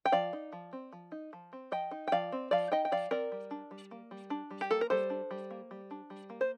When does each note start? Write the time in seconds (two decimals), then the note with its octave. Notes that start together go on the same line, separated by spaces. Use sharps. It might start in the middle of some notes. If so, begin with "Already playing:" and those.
0.06 G5
0.12 F3 D5 F5
0.33 D#4
0.52 F3
0.73 C4
0.93 F3
1.12 D#4
1.33 F3
1.53 C4
1.72 F3 D#5 G5
1.91 D#4
2.08 G5
2.12 F3 D5 F5
2.32 C4
2.51 F3 D5 F5
2.72 D#4 D#5 G5
2.85 G5
2.92 F3 D5 F5
3.11 C4 A#4 D5
3.32 G3
3.51 D4
3.71 G3
3.91 A#3
4.11 G3
4.30 D4
4.51 G3
4.61 G4
4.71 A#3 A4
4.81 A#4
4.90 G3 A4 C5
5.10 D4
5.31 G3
5.51 A#3
5.71 G3
5.91 D4
6.10 G3
6.30 A#3
6.41 C5